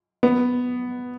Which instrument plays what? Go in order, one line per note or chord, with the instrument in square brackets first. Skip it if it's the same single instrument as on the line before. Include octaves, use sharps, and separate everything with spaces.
[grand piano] B3